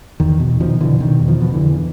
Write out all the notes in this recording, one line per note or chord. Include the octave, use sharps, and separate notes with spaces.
E2 D#3
B2
B2 D#3 F3
B2 D3 E3
B2 D#3
E2
D#3 F3
B2
D3 E3
E2